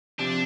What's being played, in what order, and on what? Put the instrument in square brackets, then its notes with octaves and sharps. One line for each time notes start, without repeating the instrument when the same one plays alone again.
[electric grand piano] C3 F3 C4 G4 [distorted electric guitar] D4